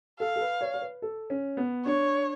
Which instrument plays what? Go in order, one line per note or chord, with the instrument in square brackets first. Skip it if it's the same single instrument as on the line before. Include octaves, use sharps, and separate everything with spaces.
[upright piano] A4 [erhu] F5
[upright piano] A4
B4
C#5
C#5
B4
A4
C#4
B3
[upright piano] D4 [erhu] C#5